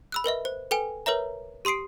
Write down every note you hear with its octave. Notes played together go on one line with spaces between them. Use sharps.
B5 E6 F#6
A#4 B4 D#5 E5
C5
A4 B4 G5 G#5
A#4 B4 C#5 E5 A#5
G4 C6 D#6 C7 D7